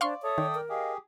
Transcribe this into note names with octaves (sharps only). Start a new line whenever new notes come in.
D4 C5 D5 F5 C6 C#6
A4 C#5 E5 D#6
D#3 D5 G5
A#4
G4 G#4 D#5 F5